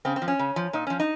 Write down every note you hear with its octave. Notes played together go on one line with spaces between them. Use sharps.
C#3 C4
C4
F3
C#4
C#3
F3
A#2 D#4
F3 C#4
D#4